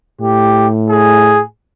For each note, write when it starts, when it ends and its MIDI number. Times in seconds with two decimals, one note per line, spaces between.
0.21 1.43 45
0.21 0.67 67
0.89 1.42 68